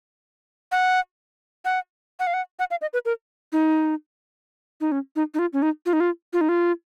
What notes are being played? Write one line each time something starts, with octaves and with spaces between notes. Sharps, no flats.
F#5
F#5
F#5
F5
F#5
F#5
F5
D#5
B4
A#4
D#4
D#4
C#4
D#4
D#4
F4
C#4
D#4
F4
D#4
F4
F4
D#4
F4